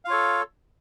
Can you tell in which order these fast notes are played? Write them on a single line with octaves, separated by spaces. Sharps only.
F5 F4 C#5 A4